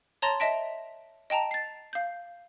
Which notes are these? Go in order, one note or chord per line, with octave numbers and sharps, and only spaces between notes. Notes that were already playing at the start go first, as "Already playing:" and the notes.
C#5 A5 A#5 C6 A6 A#6
D#5 E5 A5 A#6 B6 D7
D#5 G5 A5 A#5
A6 C7
F5 G6